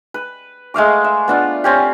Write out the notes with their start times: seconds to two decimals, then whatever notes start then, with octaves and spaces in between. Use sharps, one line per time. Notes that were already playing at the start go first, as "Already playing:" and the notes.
0.14 B4
0.74 G#3 A3 F5 D6
1.04 E5
1.28 B3 D4 F4
1.64 C4 C#4 G4